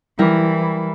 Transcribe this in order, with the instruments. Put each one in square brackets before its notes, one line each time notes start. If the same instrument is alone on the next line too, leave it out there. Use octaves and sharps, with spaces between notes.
[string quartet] E3 [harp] G3 E4 A#4